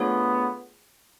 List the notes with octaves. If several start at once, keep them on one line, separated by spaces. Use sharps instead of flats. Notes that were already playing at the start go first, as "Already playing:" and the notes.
Already playing: A3 B3 D4 F4 G#4 C#5